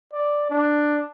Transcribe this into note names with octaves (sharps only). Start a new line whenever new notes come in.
D5
D4